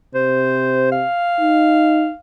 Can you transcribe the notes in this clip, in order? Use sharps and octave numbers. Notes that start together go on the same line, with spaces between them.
C3 C5
F5
D#4